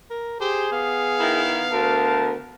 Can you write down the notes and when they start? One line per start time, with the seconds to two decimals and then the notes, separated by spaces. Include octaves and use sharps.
0.10 A#4
0.41 G4 G#4 C5
0.72 B3 F5
1.20 D#3 E4
1.73 D2 A#4 A5